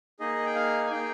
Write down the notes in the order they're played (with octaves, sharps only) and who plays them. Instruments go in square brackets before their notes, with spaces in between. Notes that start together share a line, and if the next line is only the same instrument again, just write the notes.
[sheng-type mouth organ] A#3 D#4 G#4 D#5
G5
F5
G#5
A#3 D#4 G#4 G5